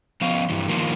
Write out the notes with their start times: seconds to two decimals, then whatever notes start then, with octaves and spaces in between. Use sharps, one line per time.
0.21 F3 B3 F5
0.50 G2 E3
0.69 D#3 F3 A#3